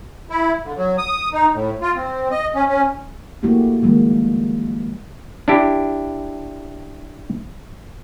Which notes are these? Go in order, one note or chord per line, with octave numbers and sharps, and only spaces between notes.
E4
D3
F#3
D#6
D#4
A2
F4
C4
D#5
C#4
C#4
A3 A#3 E4 F#4 G4
D#3 F3 G3 G#3 A#3
D4 E4 G4